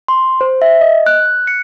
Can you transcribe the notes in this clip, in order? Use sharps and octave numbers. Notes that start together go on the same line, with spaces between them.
C6
C5
E5
D#5
F#6
F#6
C#7